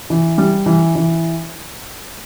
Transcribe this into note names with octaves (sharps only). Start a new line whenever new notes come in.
E3
G3
E3
E3